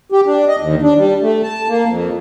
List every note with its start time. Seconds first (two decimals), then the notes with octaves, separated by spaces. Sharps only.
0.12 G4
0.26 D4
0.48 D#5
0.60 D#2
0.82 D4
0.97 G3
1.22 A3
1.43 A5
1.68 A#3
1.88 F2